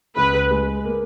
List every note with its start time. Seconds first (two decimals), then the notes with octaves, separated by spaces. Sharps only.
0.16 C#2 B4
0.51 G#3
0.84 A#3